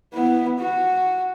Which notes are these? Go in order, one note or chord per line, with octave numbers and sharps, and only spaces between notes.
B3 E4
F#4